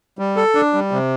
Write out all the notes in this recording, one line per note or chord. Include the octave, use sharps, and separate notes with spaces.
G3
A4
D4
G3
C3